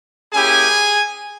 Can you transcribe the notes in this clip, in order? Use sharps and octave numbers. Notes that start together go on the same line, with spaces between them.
A#3 C#4 E4 G4 G#4 G#5